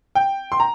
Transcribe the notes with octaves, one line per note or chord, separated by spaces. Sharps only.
G5
C6
A#5